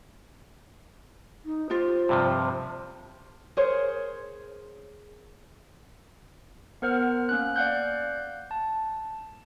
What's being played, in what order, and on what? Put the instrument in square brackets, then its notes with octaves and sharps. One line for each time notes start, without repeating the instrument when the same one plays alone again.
[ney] D#4
[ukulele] F4 G4 [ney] C5
[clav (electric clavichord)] G2 C3 F3
[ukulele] G#4 A#4 C5 C#5
[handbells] B3 A#4 C5 F#5 F6
A#3 C#4 F#6
D5 F5 F#5 F#6 G6
A5